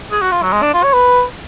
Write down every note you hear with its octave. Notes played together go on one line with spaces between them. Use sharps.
G#4
F#4
F4
F#3
G#3
D4
F4
C#5
B4